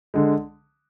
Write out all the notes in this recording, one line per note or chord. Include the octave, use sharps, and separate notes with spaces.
D3 G#3